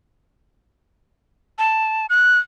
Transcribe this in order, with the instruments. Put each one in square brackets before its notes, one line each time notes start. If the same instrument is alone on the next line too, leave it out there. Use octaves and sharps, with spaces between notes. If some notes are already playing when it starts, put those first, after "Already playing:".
[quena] A5
F#6